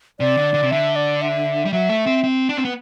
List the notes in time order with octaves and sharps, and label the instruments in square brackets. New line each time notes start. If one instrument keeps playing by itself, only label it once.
[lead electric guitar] C3 [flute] D5
[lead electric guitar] D3
D3
C3
[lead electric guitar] D3 [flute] E5
[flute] D5
E5
[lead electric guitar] G3
[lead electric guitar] F#3 [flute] E5
[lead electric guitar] A3
C4
C4
D4
C4
B3